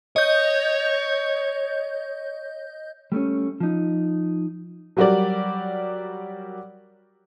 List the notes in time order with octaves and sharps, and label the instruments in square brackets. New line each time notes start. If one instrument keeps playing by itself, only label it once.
[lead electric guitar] C#5 [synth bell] D#5 G6
[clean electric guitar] G3 A3 C4 C#4
F3 D#4
[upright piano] F#3 G3 F#4 G4 A#4 D5